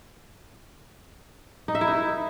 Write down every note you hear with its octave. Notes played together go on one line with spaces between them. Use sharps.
D#4
E5
E4
D#4
E5